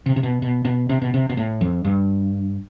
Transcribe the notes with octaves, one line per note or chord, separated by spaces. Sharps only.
C3
C3
B2
B2
B2
C3
B2
C3
B2
A2
F2
G2